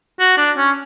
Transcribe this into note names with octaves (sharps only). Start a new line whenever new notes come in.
F#4
D4
C#4